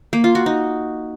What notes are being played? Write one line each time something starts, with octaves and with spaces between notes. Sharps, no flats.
A#3
F4
F#4
D#4